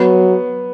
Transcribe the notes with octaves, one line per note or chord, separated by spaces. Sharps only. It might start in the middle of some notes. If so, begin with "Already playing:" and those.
Already playing: F#3 B3